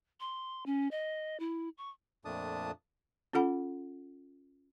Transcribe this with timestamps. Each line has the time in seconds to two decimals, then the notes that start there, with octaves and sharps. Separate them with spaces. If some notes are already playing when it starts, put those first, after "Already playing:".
0.20 C6
0.66 C#4
0.91 D#5
1.40 E4
1.78 C#6
2.25 F2 A#2 A3 D4 A5 D#6
3.33 C#4 F4 A4 F#5 B5